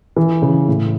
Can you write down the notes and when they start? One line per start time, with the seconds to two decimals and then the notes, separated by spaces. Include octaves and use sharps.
0.16 E3
0.42 C#3
0.68 A2